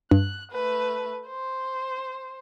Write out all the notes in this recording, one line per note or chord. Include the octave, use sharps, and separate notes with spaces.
G2 F#6
A3 B4
C5